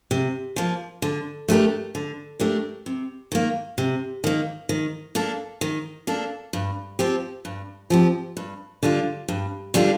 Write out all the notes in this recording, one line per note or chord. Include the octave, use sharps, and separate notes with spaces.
C3
F3 A#3
D3
A3 D4 G4 A#4
D3
A3 D4 G4 A#4
C3
D#3 A#3
C3
D#3 A#3
D#3
A#3 D4 A4
D#3
A#3 D4 A4
G2
F3 C4 G4
G2
F3 C4 G4
G2
D3 G3 D4 F4
G2
D3 G3 D4 F4